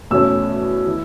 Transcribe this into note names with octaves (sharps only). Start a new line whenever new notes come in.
E2 B2 A3 C#4 E6
E3